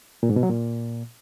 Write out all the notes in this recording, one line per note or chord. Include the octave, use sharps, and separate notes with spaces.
A#2
G#2
B2
F#3
A#2